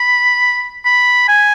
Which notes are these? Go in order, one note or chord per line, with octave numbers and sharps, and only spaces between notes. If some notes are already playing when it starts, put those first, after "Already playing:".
Already playing: B5
B5
G#5